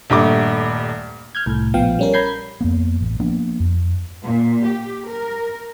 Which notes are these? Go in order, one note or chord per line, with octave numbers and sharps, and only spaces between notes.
D#1 G2 A3 D6
F6 G6 G#6
C2 A2
A#1 F3 B3 F5 G5
G3 C#4 A#4
A#5 B5 G6 G#6 C7
F2 A#3 B3
A1
F3 A#3 B3 D4
F2
A#2
G4
A#4